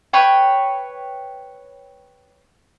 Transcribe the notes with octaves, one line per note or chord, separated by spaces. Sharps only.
B4 C#5 G5